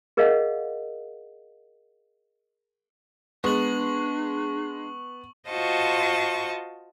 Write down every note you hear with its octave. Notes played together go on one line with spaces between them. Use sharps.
G#4 A#4 D5 D#5 F5 F#5
G#3 B3 D4 C#6 F#7
F4 F#4 C5 D#5 A5 C#6